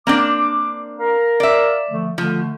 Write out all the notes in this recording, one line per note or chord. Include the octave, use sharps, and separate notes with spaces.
A#3 C4 D4 D6
A#4 F5 A#5
D5 E5
D3 F3 A3
D3 F3 A3